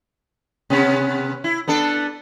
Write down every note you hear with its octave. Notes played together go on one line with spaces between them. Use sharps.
C3 B3 C#4
E4
B3 D4 A4